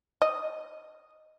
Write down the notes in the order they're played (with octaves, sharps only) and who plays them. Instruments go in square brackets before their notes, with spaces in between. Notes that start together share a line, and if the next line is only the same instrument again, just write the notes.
[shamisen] D#5